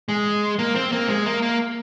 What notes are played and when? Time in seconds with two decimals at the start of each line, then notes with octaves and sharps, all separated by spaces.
0.09 G#3
0.59 A#3
0.75 C4
0.92 A#3
1.09 G#3
1.26 A#3
1.42 A#3